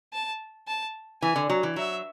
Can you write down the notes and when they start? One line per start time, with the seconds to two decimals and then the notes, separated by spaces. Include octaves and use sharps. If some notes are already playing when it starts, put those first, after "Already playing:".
0.13 A5
0.68 A5
1.22 E3 G#5
1.36 D3
1.50 F#3
1.63 E3
1.76 F#3 E5